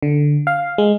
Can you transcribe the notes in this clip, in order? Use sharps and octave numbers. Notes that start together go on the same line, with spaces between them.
D3
F5
G#3